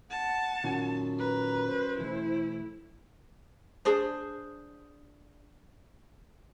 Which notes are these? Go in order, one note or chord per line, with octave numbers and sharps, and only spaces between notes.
F#5 A5
F#2 A#2 D#3 F4
B4 A#5
C5
B1 E3 A3 E4
D4 G#4 C5